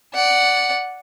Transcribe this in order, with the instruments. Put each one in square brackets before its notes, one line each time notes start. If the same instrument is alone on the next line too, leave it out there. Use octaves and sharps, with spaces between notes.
[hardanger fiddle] D5 F#5